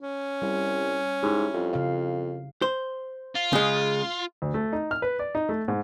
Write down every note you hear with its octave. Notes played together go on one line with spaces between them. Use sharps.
C#4
C2 G3
G#2 E4 G4
F2
C#3 F5
C5
F4
C#3 G#3
D2
A3
D#4
F6
B4
D5
D#4
A3
G#2